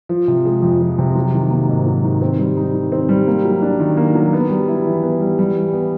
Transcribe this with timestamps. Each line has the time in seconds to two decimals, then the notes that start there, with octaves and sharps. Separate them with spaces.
0.09 F3
0.28 C3
0.45 G#3
0.62 F2
0.80 F3
0.99 C3
1.16 F#3
1.34 D#3
1.50 A#3
1.69 G#2
1.87 F#3
2.04 D#3
2.22 C4
2.39 G3
2.57 D#4
2.74 D#3
2.92 C4
3.09 G3
3.27 A#3
3.45 F#3
3.62 D4
3.80 D#3
3.97 A#3
4.15 F#3
4.33 B3
4.50 G3
4.68 E4
4.86 E3
5.03 B3
5.21 G3
5.39 G3
5.55 E3
5.73 B3